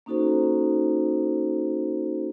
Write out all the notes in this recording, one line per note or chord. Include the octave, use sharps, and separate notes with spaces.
A#3 C#4 D#4 F#4 A4 C5